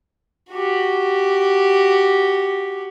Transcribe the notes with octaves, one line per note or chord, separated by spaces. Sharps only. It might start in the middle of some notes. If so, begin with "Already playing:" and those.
F#4 G4